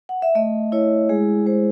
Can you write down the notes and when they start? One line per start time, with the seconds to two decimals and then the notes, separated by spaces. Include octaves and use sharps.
0.09 F#5
0.22 E5
0.35 A3 D#5
0.72 E4 C#5
1.09 G#3 G#4
1.46 G#3 C5